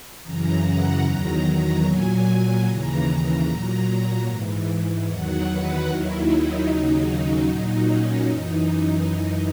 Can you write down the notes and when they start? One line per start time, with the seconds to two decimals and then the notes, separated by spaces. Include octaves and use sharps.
0.24 F#2 C#3 E3 A#5
0.64 F#5
1.04 E2 D#3 F#3 A#5
1.85 A#2 F#3 G#5
2.25 G#5
2.65 D#2 C#3 E3 A#5
3.06 A#5
3.46 A#2 F#3
4.26 G#2 E3
5.06 E2 D#3 F#3 F#5
5.46 B4
5.87 D#2 D#3 F#3 E4
6.27 D#4
6.66 D#2 C#3 F#3 D#4
7.47 A#2 F#3 D#4
7.87 C#4
8.27 F#2 E3 D#4
8.68 D#4
9.08 F#2 E3 D#4